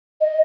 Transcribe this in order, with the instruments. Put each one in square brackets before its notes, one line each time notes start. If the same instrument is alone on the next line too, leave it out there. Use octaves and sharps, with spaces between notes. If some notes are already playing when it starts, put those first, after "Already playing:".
[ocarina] D#5